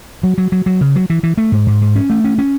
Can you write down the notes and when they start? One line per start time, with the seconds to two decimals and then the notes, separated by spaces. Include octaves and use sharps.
0.23 F#3
0.38 F#3
0.52 F#3
0.66 F#3
0.81 C#3
0.96 F#3
1.10 E3
1.23 E3
1.38 A3
1.52 G#2
1.67 G#2
1.81 G#2
1.96 C#4
2.10 A3
2.24 C#4
2.38 C#4